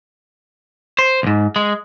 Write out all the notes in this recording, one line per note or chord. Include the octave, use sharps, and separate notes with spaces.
C5
C2 G#2
G#3